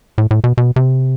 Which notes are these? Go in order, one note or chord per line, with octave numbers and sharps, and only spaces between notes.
A2
A2
B2
B2
C3